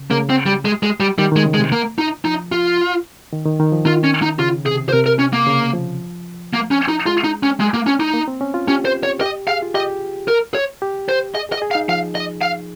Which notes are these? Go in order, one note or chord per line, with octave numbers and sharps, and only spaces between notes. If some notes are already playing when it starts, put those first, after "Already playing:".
Already playing: C#3
C#3 A#3
C4
G3
G#3
G#3
G3
D#3 G3
D#3
G#3
C#3
G#3
C3
A#3
D#4
F3 D#4
F4
D#3
D#3
D#3
F3
D#3 F4
C#4
D#4
C#3 F4
C3 G#4
C5
C3 A#4
A#4
C#4
A#3
C#3
F3
A#3
C#4
D#4
G#3 F4
D#4
C#4
G#3
A#3
C#4
D#4
A#3
C4
C#4
F4
C#4 G4
C5
C#5
G4 D#5
G#4 F5
F4
G4 D#5
A#4
C#5
G4
C5
G#4 D#5
G#4
D#5
G#4
F5
D#4
F3 F5
D#5
F5